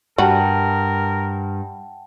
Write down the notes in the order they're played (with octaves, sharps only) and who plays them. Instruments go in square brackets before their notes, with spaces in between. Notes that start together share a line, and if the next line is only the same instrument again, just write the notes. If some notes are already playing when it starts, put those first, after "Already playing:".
[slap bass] G2 [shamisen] G3 F#4 [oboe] A#4 [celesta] F#5 G5 A5